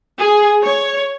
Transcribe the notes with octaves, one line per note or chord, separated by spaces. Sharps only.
G#4
C#5